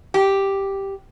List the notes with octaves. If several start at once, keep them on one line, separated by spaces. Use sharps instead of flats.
G4